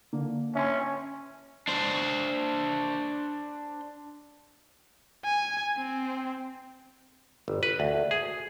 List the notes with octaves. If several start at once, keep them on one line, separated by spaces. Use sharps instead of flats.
D3 A#3
C#4 E5 C6
D4 C5
G#5
C4
G1
B4
D2
G#4